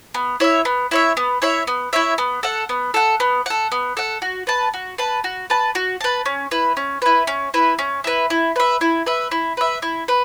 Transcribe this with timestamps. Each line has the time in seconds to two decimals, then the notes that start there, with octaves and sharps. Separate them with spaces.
0.14 B3
0.40 E4 C#5 E5
0.65 B3
0.91 E4 C#5 E5
1.17 B3
1.42 E4 C#5 E5
1.67 B3
1.93 E4 C#5 E5
2.18 B3
2.43 A4 F#5
2.69 B3
2.94 A4 F#5
3.20 B3
3.46 A4 F#5
3.72 B3
3.97 A4 F#5
4.22 F#4
4.47 B4 A5
4.74 F#4
4.98 B4 A5
5.24 F#4
5.50 B4 A5
5.75 F#4
6.01 B4 A5
6.26 C#4
6.51 E4 B4
6.77 C#4
7.02 E4 B4
7.27 C#4
7.54 E4 B4
7.79 C#4
8.04 E4 B4
8.30 E4
8.56 B4 E5
8.81 E4
9.06 B4 E5
9.31 E4
9.57 B4 E5
9.82 E4
10.08 B4